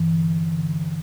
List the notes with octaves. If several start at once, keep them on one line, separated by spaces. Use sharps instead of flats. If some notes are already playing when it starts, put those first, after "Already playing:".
Already playing: G2 E3
D3
D3